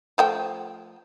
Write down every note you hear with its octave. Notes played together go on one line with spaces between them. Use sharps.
F3 A3 G5